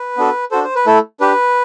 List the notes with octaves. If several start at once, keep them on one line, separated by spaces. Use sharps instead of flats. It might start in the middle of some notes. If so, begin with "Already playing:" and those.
Already playing: B4
B3 D4 F#4 A4
D4 F#4 A4 C5
C5
B4
A3 E4 A4
D4 G4 B4